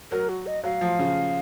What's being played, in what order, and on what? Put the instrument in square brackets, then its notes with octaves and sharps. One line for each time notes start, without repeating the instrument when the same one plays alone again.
[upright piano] F#3 [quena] A#4
[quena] F#4
D#5
[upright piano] F#3 [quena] F5
[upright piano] F3
C#3